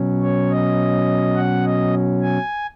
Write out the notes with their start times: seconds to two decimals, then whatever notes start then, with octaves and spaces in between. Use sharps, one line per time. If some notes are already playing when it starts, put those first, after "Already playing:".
Already playing: B2 F#3 C#4
0.22 C#5
0.51 D#5
1.35 F#5
1.65 D#5
2.22 G#5